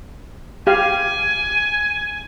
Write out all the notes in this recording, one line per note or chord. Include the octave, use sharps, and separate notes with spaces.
G4 F5 G#5